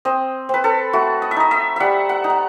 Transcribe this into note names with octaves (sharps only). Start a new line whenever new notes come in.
C4 D#5
C4 B4
A4
A3 F#4
D#5
E5
D#4 D#5
E5
G3 E5 F#5
F#5
D#4
F#5